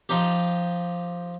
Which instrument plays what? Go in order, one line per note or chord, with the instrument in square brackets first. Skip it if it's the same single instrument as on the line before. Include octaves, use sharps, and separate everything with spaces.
[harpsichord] F3 D#4 G4